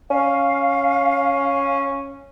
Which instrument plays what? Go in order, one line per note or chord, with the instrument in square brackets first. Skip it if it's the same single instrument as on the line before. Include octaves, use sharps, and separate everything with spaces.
[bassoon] C#4 [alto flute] F5